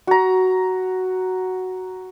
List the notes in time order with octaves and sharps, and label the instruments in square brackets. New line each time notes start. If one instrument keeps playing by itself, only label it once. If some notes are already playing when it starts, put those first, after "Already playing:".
[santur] F#4 A#5